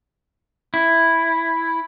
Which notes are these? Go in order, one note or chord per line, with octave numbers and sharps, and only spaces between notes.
E4